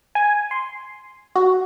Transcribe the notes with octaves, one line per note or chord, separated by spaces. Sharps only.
G#5
C6
F#4